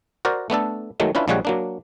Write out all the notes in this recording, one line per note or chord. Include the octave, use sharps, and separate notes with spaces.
F#4 A#4 C5 D5
A3 B3 D4 A4
D#3 F#3 G#3 A3
C#4 D4 E4 F4 B4
A#1 F3 G3 G#3 C#5 F#5
F#3 A#3 D4